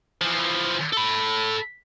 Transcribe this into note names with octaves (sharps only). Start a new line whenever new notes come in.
E3 F3
A4 B5